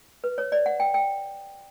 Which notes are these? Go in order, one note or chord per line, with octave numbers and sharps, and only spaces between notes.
B4
C#5
D5
F#5
G5
G5